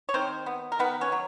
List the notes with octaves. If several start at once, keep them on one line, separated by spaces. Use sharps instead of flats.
C#5
D#3 C4 C5
B3
A#4
D#3 B3 B4
C#4 C#5
F#3